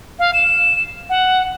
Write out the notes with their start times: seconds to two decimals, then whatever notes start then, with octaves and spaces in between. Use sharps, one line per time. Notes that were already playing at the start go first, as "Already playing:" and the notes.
0.19 F5
0.34 E7
1.09 F#5